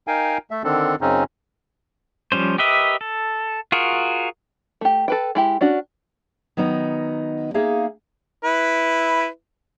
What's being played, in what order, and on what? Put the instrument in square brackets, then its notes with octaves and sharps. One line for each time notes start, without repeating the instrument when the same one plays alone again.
[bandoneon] D#4 A#4 F5 G5 G#5
A3 E5
D3 D#3 C4 D4 A4
F#2 C#3 C4 C#4 D#4
[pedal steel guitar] F3 G3 C#4 C5
G4 A#4 B4 D#5 E5
A4
F4 F#4 G#4 A#4
[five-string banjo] A3 G4
A4 B4 G5
G#3 E4 G4
C#4 D4 F#4
[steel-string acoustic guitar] D#3 F#3 B3 D#4
A#3 D#4 G#4 E5 F5
[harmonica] E4 B4